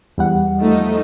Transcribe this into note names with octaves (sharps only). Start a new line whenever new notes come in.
E2 G3 F#5
F3 A3 D#4